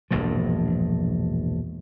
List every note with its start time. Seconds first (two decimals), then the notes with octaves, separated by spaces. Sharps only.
0.11 E1 A#1 G2 F3